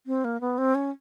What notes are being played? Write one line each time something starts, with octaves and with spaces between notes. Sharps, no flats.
C4
A#3
B3
C4
C#4